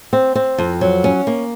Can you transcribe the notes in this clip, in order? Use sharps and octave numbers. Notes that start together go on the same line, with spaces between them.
C4
C4
F2
F#3
C#4
A#3